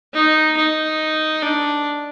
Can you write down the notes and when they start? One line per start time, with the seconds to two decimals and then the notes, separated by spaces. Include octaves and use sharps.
0.13 D#4
0.57 D#4
1.42 D4